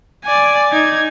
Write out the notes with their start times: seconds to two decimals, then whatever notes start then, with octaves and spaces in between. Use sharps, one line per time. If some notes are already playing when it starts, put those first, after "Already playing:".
0.25 D5 G#5
0.72 D#4 G#6